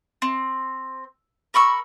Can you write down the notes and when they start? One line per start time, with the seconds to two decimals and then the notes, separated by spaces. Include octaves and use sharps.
0.22 C4
1.54 A#4 B5 C#6 E6